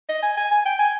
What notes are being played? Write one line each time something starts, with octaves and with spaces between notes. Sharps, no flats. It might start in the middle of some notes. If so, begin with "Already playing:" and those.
D#5
G#5
G#5
G#5
G5
G#5